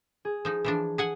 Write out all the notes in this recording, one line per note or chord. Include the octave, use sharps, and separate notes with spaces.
G#4
F3 D#4
E3 F3 D4
G#4 F#5 G#5